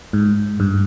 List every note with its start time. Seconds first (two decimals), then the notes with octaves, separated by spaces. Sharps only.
0.13 G#2
0.60 G2